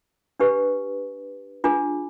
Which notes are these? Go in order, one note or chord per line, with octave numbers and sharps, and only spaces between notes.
D4 G4 B4
D4 F4 G#4